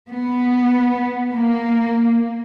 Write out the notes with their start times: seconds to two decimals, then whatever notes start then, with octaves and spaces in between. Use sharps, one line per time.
0.10 B3
1.32 A#3